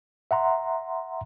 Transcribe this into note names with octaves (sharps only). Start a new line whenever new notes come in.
E5 F#5 A#5 C6